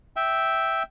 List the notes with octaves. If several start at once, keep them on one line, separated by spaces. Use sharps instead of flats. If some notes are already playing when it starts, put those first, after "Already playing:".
E5 G5